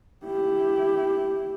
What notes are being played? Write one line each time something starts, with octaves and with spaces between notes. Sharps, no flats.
E4 G4